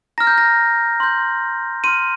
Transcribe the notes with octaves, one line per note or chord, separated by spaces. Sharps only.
A#5 F6 A#6
G6
A#6
C6 G6
C6 F6 D#7